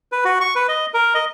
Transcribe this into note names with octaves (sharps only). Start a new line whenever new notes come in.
B4
F#4
C#6
B4
D#5
A#4
D#5